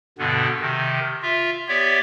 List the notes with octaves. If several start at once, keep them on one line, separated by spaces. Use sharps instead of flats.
G2 B2 D3 B3
C3 D#3
F4 E5
B3 G4 C#5 D5 E5